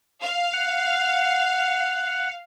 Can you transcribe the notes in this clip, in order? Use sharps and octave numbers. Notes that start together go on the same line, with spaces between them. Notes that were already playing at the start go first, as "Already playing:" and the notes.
F5
F#5